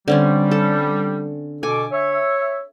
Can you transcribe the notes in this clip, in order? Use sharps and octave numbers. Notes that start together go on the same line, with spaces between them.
D3 G3 C4 C#4
A4
B2 A4 G#5 D6
C#5 E5